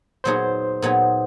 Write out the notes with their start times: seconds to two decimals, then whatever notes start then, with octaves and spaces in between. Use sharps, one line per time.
0.24 A#2 F#3 B3 D#4 G#4 C5
0.82 A#2 F#3 B3 D#4 G#4